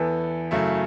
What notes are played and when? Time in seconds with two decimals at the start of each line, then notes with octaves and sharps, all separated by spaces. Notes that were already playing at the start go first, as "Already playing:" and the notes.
Already playing: E2 E3 B3 E4 A4
0.51 F#2 C#3 F#3 A3 E4